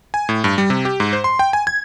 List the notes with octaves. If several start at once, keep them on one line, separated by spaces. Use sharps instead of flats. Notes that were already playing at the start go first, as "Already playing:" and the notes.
G#5
A2
G2
G3
C3
G4
G#2
C5
C6
G5
G#5
G#6